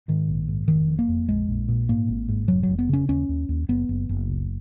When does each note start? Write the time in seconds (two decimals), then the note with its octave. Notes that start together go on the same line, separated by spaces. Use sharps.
0.08 G#2 D#3
0.28 A#1
0.48 G#2
0.68 F1 D#3
0.88 F2
0.99 A#3
1.09 F2
1.28 A#1 G#3
1.49 A#1
1.68 A#2
1.89 G#2 A#3
2.09 G#1
2.29 G#2
2.48 F1 F#3
2.63 F#3
2.69 F1
2.79 B3
2.89 C#3 C#4
3.09 D#2 C#4
3.29 D#2
3.49 D#2
3.69 F#1 B3
3.89 F#1
4.09 F#1
4.29 C#2